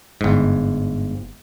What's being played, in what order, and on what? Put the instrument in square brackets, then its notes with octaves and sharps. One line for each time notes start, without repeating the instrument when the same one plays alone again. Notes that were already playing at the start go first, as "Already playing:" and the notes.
[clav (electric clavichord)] G1 G#2